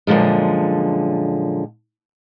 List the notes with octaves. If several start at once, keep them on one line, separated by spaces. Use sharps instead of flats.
F#2 A#2 D3 F3 G#3